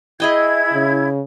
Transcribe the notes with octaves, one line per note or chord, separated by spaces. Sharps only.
E4 G#4 D#5 G5 G#6
C#3